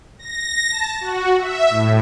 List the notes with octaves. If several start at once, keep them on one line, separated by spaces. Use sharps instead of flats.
A#6
A5
F#4
E5
A2